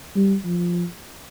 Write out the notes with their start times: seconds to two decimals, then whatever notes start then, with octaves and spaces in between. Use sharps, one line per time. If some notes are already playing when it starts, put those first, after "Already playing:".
0.15 G3
0.45 F3